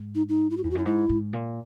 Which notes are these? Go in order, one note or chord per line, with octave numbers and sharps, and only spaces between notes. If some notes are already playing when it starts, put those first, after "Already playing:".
Already playing: G#2
D#4
D#4
E4
F#4
E2 E4
F#4
F#2 E4
G#2 E4
G#2
A#2